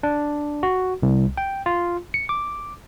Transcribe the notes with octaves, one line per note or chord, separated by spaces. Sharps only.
D4
F#4
C2
G5
F4
C#7
D6